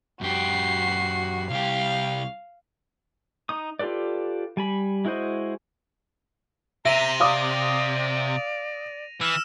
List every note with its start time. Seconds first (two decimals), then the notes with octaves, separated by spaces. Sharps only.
0.21 F#2 F#4 G4 C7
1.50 C2 G4 F5
3.49 D#4 D#6
3.79 F4 G4 A4 B4 D5
4.57 G3 G#5 B5
5.05 G#3 E4 F#4 C5 D#5
6.85 C3 E5 A#5 A#6 D#7 F7
7.20 D5 F5 D6 D#6
9.21 E3 E6 F6 E7